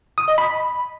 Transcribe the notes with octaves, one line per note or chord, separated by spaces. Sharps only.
D#6
D#5
B5